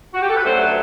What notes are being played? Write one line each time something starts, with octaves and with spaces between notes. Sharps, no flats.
F#4
G4
A4
B4
F#2 D3 F#3 A3 C5
B4